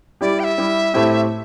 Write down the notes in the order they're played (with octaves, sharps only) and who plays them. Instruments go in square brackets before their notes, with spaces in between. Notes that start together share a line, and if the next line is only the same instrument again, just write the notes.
[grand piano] G3 E4 G4 [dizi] D5
[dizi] G5
E5
[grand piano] G3 E4 G4
A2 A3 C4 E4 G4